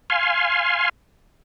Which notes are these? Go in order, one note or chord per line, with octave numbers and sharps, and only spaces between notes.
F5 G#5 C6